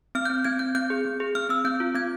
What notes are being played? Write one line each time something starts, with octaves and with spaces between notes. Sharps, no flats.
C4 F6
G6
C4
C4 G#6
C4 G6
C4 G6
G#4
C4
G#4
C4 F6
C4 E6
C4 G6
F4
C4 G#6